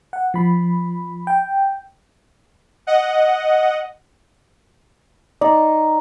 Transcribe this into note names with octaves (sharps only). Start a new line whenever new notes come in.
F#5
F3 B5
G5
D#5 F#5
D#4 D5